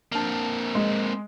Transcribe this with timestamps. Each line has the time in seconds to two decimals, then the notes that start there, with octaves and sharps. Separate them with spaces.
0.12 A#3 C4 D4 A5
0.75 G#3